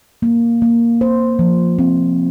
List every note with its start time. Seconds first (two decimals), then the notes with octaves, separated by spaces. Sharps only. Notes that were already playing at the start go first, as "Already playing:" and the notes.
0.22 A#3
0.62 A#3
1.01 C5
1.39 F3
1.79 C4